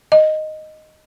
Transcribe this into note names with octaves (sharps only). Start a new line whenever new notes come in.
D#5